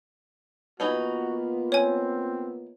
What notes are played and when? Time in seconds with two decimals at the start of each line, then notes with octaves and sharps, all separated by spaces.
0.80 E3 A#3 B3 D#4 F4 F#4 B5
1.72 C4 C#5 G#5